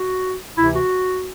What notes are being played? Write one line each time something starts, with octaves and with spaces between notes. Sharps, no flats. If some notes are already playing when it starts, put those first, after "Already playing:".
Already playing: F#4
D2 C3 E3 E4
F#4